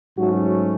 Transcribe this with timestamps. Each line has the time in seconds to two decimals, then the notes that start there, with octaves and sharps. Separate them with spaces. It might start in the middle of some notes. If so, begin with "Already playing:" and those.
0.17 G#2 F#3 A3 C#4 F#4